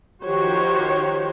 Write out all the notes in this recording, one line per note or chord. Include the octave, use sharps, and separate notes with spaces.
D#3 F3 F#4 G4 C5 C#5